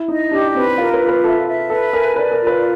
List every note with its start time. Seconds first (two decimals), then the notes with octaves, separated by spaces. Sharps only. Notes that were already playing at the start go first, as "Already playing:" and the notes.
Already playing: E4
0.08 D#4 D#5
0.31 D4 G4
0.55 C4 B4
0.78 F4 A#4
0.94 B4
1.01 F4
1.08 B4
1.24 A4 E5
1.47 E5
1.70 A4 B4
1.93 A#4 G#5
2.16 B4 D5
2.32 A#4
2.39 F4
2.47 B4